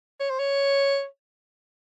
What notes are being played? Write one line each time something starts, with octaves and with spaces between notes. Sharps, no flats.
C#5
C5
C#5